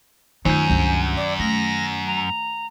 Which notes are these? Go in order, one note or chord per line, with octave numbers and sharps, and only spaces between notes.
F#2 D#3 D#4 F4 G#5 G6
C#2 G2
D5
A3 A#6
A#5